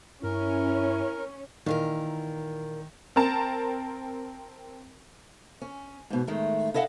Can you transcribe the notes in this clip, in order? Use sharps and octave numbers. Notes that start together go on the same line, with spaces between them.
G2 C#4 E4 A#4
A#2 D#3 E3 A#4
C4 A#4 A5
C#4
G#2 B2
A2 D#3 G#3 A3
E4 A4 D#5 F5 F#5